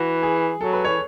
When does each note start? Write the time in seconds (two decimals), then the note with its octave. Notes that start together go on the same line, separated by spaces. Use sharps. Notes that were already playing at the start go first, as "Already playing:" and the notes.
Already playing: E3 F#4
0.23 G#4
0.60 F#3 A4
0.73 B4
0.84 E3 C#5